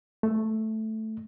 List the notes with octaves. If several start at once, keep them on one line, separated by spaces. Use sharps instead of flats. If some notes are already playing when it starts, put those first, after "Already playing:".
A3